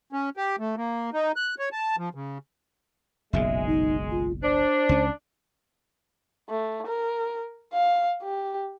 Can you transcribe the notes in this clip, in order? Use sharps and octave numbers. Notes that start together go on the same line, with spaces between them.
C#4
G4
A3
A#3
D#4
F#6
C#5
A5
F3
C#3
F#1 B1 A#2 G#3 E5
D#4
F4
D4 C5
C#2 C#4
A3
A#4
F5
G4